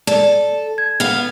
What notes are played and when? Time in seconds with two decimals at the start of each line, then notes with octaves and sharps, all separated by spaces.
0.07 A4 D5
0.78 G#6
1.00 B3 F5